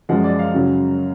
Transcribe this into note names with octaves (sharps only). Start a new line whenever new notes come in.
F#2 F3 G#3 F#5
D5
F5
F#2 C#3 F#3